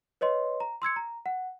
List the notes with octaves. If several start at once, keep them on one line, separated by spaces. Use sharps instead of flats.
B4 C#5 D#5 C6
A#5
C6 E6 G#6 C#7
A#5
F#5